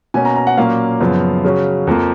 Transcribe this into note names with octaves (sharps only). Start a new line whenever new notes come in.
B2 A#3 C#4 G#5
A#5
A#5
F#5
A#2 F#3 A#3 C#4 F5
F#2 C#3 F3 B3
C#3 F#3 C#4
F2 F3 A#3